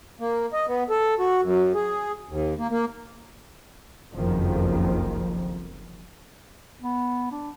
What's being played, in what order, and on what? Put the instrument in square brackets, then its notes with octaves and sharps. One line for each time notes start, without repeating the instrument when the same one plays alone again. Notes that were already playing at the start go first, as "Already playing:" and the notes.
[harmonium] A#3
D#5
B3
A4
F#4
F#2
G#4
D#2
A#3
A#3
[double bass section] F#1 C2 F2 D#3 F3
[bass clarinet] B3
D4